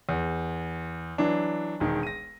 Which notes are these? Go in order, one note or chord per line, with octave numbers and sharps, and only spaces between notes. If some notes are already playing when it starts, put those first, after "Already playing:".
E2
E3 F#3 D4
E1 D#3
A#6 D#7